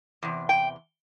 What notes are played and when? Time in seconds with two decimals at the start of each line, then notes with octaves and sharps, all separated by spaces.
0.23 E2 C3
0.49 G5